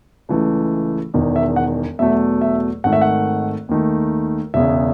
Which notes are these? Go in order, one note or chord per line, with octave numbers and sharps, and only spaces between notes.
C#2 C#3 E3 A3
E1 E2 D#3
E5
F#5
E2 B2 F#3 A3 E5
E5
G#1 G#2 D#3 A3 F#5
E5
F#5
D#2 D#3 A3
E1 E2 C#3 E5